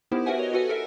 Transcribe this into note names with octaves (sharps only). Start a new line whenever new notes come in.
B3 D#4 E4 G4 A#4 C5
F#4 A#4 B4 E5 F#5 G#5
C#5 D#5
F#4 A4 B4 F#5 G#5
A4 A#4 E5